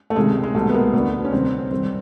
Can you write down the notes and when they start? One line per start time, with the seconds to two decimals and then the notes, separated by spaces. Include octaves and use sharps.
0.10 A3
0.16 C#2 C3 D#3 G#3
0.43 G#3
0.55 C2 B2 A3
0.69 B3
0.74 A#3
0.93 D2 D3 B3
1.25 C#4
1.32 C2 C3 D#3 C4
1.71 G2 D#3 C4